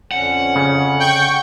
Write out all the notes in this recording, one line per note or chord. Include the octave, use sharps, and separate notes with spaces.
F2 D3 C#4 F#5
C#3
G5 C#6 G6